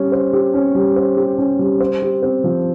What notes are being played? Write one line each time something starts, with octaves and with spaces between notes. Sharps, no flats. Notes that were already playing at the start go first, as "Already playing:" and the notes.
Already playing: G3 C#4
C5
G4
C#4
G3
C5
G4
C#4
G3
C5
G4
C4
F3